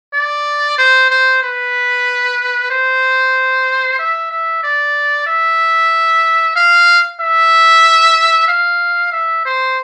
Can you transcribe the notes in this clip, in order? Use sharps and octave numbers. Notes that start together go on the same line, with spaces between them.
D5
C5
C5
B4
C5
E5
E5
D5
E5
F5
E5
F5
E5
C5